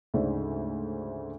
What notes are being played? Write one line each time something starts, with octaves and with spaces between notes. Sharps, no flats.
D2 G#2 C#3 C5 D5 E5